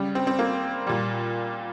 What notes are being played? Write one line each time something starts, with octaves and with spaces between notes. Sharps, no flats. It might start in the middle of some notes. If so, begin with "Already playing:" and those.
Already playing: C#3 G3
C4
C4
A#3
A#2 G3